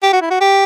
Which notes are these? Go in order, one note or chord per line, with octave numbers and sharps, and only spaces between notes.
G4
F#4
E4
F#4
G4